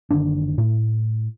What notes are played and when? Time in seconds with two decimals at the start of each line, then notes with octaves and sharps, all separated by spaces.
0.11 F#1 D3 D#3 D4
0.58 A2